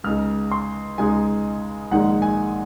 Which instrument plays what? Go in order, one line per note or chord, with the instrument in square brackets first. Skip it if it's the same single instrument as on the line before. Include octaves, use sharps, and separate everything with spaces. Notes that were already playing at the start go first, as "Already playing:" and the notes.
[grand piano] C#2 C#3 G#3 D#4 F6
C6
C#2 C#3 G#3 D#4 G#5
A#1 G#2 D#3 G#3 D#4 F#5
G#5